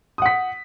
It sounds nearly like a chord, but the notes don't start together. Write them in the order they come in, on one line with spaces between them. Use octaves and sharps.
D#6 F#5 B6